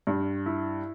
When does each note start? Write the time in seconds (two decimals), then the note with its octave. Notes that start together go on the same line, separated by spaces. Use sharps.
0.07 G2
0.46 E4